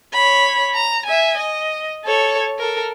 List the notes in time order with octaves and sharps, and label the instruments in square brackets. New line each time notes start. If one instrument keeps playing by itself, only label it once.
[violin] C#5 B5
A#5
E5 G#5
D#5
A4 C#5
A4 A#4